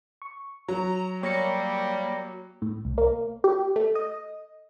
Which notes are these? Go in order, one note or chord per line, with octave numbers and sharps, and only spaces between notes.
C#6
F#3 A#5
G3 A#3 C#5 A#6 C#7
A2
C2
A#3
G4
A3
D#5